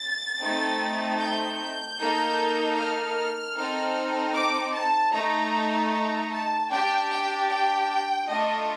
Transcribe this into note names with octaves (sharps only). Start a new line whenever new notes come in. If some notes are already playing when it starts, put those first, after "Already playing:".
Already playing: A6
A3 C4 D#4 A4
G6
A#3 D#4 A4
F6
C4 D#4 A4
D6
A5
A3 D#4 A4 A#5
A#5
A5
D4 G4 G5
G5
G5
A3 D4 F4 A4 D#5